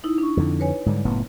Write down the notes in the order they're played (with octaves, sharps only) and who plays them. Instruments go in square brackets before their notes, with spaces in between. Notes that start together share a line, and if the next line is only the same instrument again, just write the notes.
[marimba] D#4 E4
D4 C#6
[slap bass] F2 D3
[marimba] B4 C#5 G#5
[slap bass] G#2 D3 G3
F#1 A2 B3